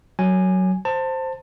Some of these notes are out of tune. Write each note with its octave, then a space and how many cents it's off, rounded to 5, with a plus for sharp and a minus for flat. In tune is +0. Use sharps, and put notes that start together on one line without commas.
F#3 +10 G#5 +0
C5 +0 A5 +25